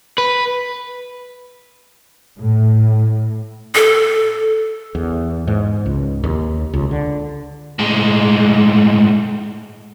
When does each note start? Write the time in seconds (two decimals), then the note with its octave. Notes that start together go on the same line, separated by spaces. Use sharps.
0.18 B4
2.39 A2
3.75 A4
4.95 E2
5.47 G#2
5.86 C#2
6.24 D#2
6.74 C#2
6.91 D3
7.79 A2 G#3